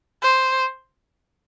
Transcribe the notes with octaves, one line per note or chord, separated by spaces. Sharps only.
C5